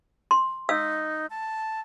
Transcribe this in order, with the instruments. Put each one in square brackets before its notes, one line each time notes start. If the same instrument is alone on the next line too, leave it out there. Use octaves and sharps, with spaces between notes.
[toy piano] C6
[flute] D#4 [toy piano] F5 E6
[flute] A5